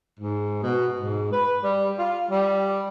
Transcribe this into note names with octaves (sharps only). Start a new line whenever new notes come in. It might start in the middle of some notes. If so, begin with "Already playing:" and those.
G#2
B2
G#2
B4
G3
F4
G3